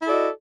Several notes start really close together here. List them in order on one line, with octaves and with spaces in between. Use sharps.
E4 A4 D5 F#4 D#5